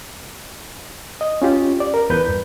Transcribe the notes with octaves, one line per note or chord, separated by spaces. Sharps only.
D#5
C#4 F4 G4
D5
A#4
E2 B4 G6
G2